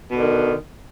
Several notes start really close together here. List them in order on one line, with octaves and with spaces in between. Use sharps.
B2 D3 D#3